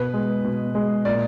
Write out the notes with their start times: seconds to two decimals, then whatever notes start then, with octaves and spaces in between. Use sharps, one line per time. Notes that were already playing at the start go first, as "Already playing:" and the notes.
Already playing: B2 B4
0.14 G#3
0.45 B2
0.75 G#3
1.05 A#2 D5